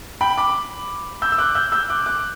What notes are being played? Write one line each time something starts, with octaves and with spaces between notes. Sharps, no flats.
G5 B5
B5 D6
E6 G6
E6
D6 F#6
E6 G6
E6 G6
D6 F#6
D6 F#6